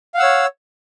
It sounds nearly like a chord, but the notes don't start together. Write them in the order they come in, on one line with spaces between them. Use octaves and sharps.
F5 F#5 E6 C#5